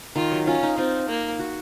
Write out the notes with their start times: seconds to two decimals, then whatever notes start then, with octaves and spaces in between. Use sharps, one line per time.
0.16 D#3 F4
0.32 F#3
0.47 C#4 F4
0.63 D#4
0.78 C4 F4
1.08 A#3
1.39 F#4